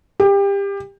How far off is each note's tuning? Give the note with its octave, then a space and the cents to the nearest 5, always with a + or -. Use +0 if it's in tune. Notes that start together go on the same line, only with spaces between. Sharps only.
G4 +25